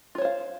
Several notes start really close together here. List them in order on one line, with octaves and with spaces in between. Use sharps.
F4 C#5 C5 F5